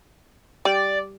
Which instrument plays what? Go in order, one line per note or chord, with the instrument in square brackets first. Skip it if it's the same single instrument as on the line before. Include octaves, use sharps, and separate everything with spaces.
[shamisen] G3 [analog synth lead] D5